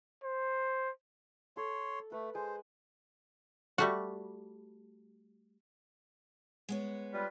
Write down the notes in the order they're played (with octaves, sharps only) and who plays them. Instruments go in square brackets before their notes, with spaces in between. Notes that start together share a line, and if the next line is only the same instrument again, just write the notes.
[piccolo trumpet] C5
[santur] A4 [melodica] C#5 C6
[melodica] A3 [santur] B4
[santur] G#3 [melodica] C5
[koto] G3 A3 F#4
[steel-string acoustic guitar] G#3 B3 C#5
[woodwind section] G3 F4 B4